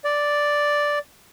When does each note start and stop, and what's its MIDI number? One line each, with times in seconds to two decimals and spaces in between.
0.04 0.99 74